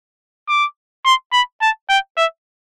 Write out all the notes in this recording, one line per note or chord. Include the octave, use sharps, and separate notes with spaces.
D6
C6
B5
A5
G5
E5